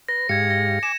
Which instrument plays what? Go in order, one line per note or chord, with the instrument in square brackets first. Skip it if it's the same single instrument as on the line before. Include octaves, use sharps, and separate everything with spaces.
[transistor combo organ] B4 [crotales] A#6
[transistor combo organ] G#2 G4 F5 [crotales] G#6 C#7
[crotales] A#6
[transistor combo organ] G#5 D6 [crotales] E7